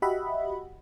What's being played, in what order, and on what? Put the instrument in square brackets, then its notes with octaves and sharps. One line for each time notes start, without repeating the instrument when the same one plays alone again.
[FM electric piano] F#4 G4 D#5 E5 F#5 B5